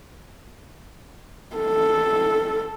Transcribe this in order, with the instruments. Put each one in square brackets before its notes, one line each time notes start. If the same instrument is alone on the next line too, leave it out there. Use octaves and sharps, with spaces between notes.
[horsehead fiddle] A4